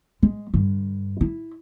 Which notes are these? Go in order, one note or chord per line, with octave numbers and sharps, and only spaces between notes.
G#3
G2 D3
E4